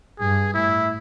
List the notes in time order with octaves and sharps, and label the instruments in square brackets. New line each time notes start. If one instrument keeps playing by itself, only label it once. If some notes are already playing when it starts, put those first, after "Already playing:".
[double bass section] G2 [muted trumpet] G#4
[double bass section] A2 [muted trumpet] E4